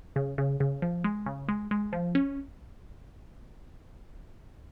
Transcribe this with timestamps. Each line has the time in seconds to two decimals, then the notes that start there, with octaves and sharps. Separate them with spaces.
0.16 C#3
0.38 C#3
0.60 C#3
0.82 F3
1.04 G#3
1.26 C#3
1.49 G#3
1.71 G#3
1.93 F3
2.15 C#4